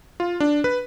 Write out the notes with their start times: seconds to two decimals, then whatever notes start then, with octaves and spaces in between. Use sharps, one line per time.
0.20 F4
0.40 D4
0.64 B4